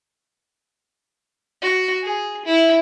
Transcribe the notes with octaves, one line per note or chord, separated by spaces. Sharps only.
F#4
G#4
E4